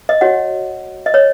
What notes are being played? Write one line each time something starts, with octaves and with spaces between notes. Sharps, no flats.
D#5
F#4 C#5 F#5
D#5
C#5